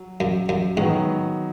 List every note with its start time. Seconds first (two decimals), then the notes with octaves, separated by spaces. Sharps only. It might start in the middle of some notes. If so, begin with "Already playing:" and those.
Already playing: F#3
0.20 F#2
0.49 F#2
0.77 G#2 D#3 F#3 B3